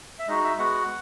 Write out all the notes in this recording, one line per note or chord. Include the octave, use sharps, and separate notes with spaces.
E5
G#3 D#4 F#4 D#5
E5
G#3 B3 F#4 F#5